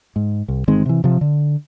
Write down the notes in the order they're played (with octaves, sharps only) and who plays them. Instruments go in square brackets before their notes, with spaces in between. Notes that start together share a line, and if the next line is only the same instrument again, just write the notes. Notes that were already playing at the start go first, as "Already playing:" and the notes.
[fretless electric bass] G#2
C2
G1 D#3 G#3 C4
C3 E3
C3 F3
D3